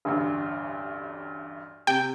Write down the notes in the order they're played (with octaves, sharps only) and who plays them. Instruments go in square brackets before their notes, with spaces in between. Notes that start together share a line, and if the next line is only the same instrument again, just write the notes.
[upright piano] A1 D2 G2
[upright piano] C3 [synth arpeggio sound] G5